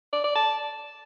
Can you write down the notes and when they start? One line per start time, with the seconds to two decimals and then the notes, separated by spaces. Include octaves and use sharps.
0.13 D5
0.24 D5
0.35 A5